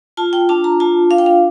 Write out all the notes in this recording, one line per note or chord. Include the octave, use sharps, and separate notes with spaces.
F4 A5
G5
D4 A5
A#5
F4 A5
D4 F5
G5
F5